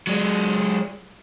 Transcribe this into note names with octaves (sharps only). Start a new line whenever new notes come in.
F#3 G#3